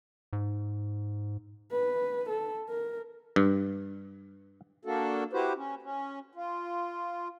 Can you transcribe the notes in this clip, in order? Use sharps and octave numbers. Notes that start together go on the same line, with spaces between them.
G#2
B4
A4
A#4
G2
A#3 D4 F#4 A4
E4 F#4 G4 B4 C5
C#4
C#4
F4